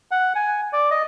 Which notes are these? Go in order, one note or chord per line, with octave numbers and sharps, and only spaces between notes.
F#5
G#5
D5
D#5